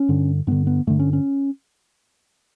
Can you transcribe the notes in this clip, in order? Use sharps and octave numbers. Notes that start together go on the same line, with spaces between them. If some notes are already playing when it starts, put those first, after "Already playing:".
Already playing: C#4
G2 D3
G2 D3 B3
B3
G2 D3 A3
C#4
C#4